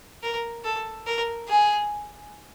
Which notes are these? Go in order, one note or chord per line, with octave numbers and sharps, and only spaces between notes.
A#4
A4
A#4
G#4